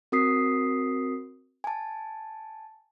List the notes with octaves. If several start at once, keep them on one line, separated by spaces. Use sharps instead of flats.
C4 F#4 A#4 D#6 B6 C7
G#5 A5